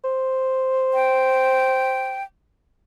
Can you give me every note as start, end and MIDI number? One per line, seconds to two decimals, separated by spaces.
0.04 2.20 72
0.94 2.23 79